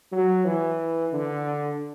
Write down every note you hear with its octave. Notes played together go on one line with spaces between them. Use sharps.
F#3
E3
D3